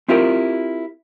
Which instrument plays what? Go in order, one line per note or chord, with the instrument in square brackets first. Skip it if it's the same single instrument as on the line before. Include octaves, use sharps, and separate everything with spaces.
[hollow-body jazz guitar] C4 E4 F4 G4 A#4